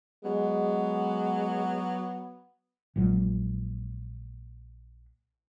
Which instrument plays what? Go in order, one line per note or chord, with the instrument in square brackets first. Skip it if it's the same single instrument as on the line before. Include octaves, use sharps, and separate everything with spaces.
[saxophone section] F#3 B3 [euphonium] G#3
[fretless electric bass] A#1 A#2 F#3 G#3